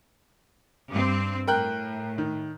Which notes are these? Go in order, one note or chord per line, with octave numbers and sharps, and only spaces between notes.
G2 C4
A2 A#4 G5 F#6
D#3